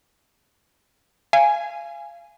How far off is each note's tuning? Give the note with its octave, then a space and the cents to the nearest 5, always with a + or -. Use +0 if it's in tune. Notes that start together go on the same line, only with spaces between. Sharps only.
F5 -25 G#5 +0